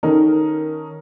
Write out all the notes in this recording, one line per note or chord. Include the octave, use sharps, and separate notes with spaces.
D#3 C#4 D#4 A4 A#4